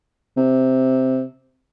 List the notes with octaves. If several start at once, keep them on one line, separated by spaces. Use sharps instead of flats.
C3